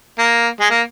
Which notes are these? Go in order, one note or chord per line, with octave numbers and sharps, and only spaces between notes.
A#3
G#3
A#3